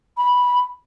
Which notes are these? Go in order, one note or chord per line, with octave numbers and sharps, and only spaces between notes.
B5